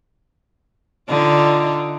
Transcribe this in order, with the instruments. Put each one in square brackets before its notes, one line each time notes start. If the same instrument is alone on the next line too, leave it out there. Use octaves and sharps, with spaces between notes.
[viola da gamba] D3 D#4 F4